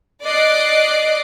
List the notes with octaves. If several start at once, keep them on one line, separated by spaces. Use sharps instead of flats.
D5 D#5 D6 F#6 C7